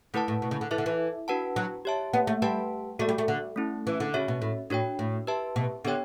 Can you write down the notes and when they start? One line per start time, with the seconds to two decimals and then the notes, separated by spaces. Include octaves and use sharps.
0.14 D3 A3 E4 B4 F#5 A5
0.28 A2
0.42 B2
0.51 C#3
0.61 D3
0.71 E3 E4 A4 E5
0.78 D3
0.86 E3
1.28 D4 F#4 B4 F#5 A5
1.56 F#3
1.85 G4 C#5 E5 A5
2.14 B3
2.27 A3
2.42 G3 G4 B4 F#5 A5
2.99 A3 F#4 A4 D5
3.09 G3
3.18 A3
3.28 D3
3.56 A3 C#4 E4
3.87 E3
4.00 D3
4.14 C#3 C#4 F#4 C#5 E5
4.28 B2
4.42 A2
4.70 A2 D4 F#4 C#5 G5
4.99 A2
5.27 G4 B4 E5 A5
5.56 B2
5.85 D3 B3 D4 G4 C#5 G5